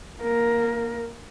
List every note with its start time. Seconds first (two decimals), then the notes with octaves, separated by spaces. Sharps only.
0.21 A#3 A#4